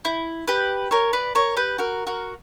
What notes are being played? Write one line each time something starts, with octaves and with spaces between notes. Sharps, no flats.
E4
G4 B4
A#4 C#5
B4 D5
A#4 C#5
G4 B4
F#4 A#4
F#4 A#4